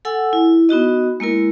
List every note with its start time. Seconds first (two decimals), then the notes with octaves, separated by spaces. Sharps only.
0.05 A4 F#5 G#5 E6
0.33 E4
0.69 B3 D#4 F#4 D#5
1.20 G#3 A#3 E4 A#4